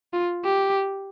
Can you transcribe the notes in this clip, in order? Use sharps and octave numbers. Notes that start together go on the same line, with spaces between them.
F4
G4